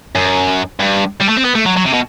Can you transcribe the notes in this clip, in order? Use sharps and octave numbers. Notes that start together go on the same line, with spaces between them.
F#2
G2
G3
A3
C4
B3
A3
F#3
F#3
C3
B2